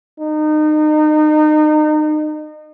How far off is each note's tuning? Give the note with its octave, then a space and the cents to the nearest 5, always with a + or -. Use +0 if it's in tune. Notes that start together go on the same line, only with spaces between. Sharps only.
D#4 -30